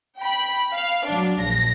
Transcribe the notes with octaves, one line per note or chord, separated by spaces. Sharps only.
G5 B5
F5
F#3 D4
A#1 A#6